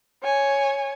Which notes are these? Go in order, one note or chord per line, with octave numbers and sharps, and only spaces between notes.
C#5 G#5